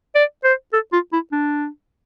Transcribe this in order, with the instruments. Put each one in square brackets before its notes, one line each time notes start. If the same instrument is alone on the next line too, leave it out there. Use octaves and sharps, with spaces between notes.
[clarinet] D5
C5
A4
F4
E4
D4